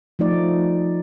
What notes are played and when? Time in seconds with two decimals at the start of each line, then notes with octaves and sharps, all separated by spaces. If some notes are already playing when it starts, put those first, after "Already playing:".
0.19 F3 A3 D#4 D5